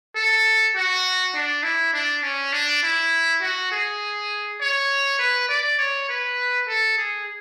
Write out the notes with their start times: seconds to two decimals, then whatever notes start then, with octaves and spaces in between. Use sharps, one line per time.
0.15 A4
0.75 F#4
1.34 D4
1.63 E4
1.93 D4
2.23 C#4
2.52 D4
2.83 E4
3.42 F#4
3.72 G#4
4.61 C#5
5.19 B4
5.49 D5
5.79 C#5
6.09 B4
6.68 A4
6.98 G#4